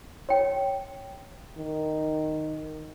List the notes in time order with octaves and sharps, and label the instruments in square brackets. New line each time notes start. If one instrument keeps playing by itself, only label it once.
[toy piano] C#5 G5
[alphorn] D#3